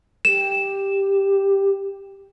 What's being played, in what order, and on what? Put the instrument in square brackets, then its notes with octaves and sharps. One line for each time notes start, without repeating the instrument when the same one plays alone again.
[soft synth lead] G4 [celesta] E7